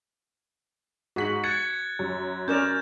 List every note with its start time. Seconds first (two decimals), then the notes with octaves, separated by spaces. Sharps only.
1.16 G#2 F#4 B6 F#7
1.44 F#6 G#6 A6 C#7
1.99 F#2
2.48 C#4 A#4 D5 G6 E7